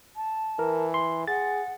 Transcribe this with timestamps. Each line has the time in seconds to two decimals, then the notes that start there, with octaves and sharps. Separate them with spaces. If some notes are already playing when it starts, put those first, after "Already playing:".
0.16 A5
0.59 E3 A#4
0.94 C6
1.28 G#4 F#5 A6